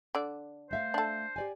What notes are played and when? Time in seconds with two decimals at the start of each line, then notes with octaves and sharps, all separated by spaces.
0.15 D3 D5
0.71 A3 C5 E5 F5
0.94 D4 A4
1.36 G4 D5 G#5